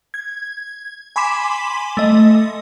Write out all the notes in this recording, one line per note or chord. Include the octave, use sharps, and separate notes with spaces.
G#6
G#5 B5 C6 D6 B6 E7
A3 D#5